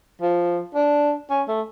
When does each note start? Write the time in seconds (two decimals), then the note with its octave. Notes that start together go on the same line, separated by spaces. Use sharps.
0.21 F3
0.75 D4
1.30 C#4
1.48 A3